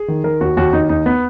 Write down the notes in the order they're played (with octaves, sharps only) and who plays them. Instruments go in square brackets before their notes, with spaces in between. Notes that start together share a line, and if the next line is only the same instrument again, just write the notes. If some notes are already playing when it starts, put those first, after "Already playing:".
Already playing: [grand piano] G#4
D#3
D#3 A#4
D#2 F#4
D#2 F#4
D#2 D#4
D#2 D#4
B3